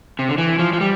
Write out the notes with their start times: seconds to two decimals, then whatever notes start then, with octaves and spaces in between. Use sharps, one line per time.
0.19 C3
0.29 D3
0.38 E3
0.59 F3
0.73 F3
0.81 G3